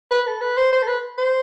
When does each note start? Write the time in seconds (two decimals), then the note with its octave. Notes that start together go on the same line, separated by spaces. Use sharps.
0.11 B4
0.27 A4
0.41 B4
0.57 C5
0.73 C5
0.82 A4
0.87 B4
1.18 C5